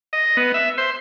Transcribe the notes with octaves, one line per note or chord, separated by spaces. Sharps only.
D#5
B3
E5
C5